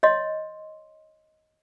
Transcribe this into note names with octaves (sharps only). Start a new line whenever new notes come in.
C#5 D#5 C6